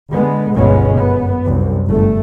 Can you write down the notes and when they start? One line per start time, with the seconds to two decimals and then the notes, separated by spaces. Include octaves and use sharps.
0.14 D3 G#3 B3
0.56 G1 C#2 B2 G#3 B3 C#4
0.96 F#2 B3
1.43 C2 F#2
1.89 G1 A3